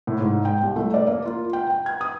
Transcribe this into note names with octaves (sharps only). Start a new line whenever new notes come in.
A2
G#2
G5
C2
A3
D5
A#3
F4
G5
G5
G#6
D#6